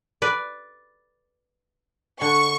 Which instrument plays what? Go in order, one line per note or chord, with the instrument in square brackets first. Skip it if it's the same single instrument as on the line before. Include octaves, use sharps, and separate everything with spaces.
[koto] B4 D5
[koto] D3 [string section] C#6